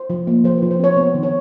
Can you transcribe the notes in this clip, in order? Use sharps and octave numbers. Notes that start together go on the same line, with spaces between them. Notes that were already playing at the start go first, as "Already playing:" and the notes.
Already playing: C5
F3
A#3
F3 C5
F3 B4
C5
C4 C#5
B3 C5
D#3
C#5